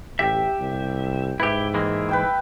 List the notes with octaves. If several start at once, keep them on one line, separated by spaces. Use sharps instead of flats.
A1 G4 E5 G5
C2
G#2 E4 G4 B4 E5
E3 G#3 A#3
B4 G5 E6